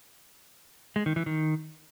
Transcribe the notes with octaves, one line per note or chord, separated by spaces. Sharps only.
G#3
D#3
E3
D#3